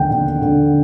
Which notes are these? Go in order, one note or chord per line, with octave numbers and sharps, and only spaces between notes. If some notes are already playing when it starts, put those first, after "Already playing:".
Already playing: D#2 D3 F#5 G5
D3
D3